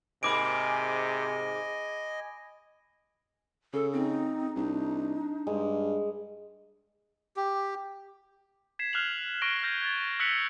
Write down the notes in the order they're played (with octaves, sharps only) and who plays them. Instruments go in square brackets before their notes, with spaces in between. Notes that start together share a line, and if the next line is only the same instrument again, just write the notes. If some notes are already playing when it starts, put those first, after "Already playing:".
[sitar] G#2 A#3 [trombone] C3 [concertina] D#5 G#5 [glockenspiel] B5 D6 D7
[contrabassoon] C#3 [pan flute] A4
[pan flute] C4 [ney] D#4
[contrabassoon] C2 [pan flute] D4 [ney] D#4
[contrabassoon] G2 [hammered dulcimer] G#3
[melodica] G4
[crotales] G#6 B6 C7 E7
F6 F#6 G#6 C7 F7 F#7
C#6 F6 A#6 D7 G7
F6 G6 G#6 A#6
G#6 A6
E6 F#6 B6 C#7 F7 F#7